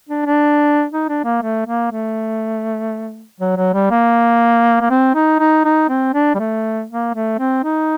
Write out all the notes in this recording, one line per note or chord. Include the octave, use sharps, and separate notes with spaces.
D4
D4
D#4
D4
A#3
A3
A#3
A3
F#3
F#3
G3
A#3
A#3
C4
D#4
D#4
D#4
C4
D4
G3
A3
A#3
A3
C4
D#4